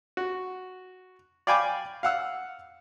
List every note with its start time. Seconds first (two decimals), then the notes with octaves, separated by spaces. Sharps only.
0.17 F#4
1.47 D5 F5 G5 G#5 B5 D6
2.03 F5 F#5 E6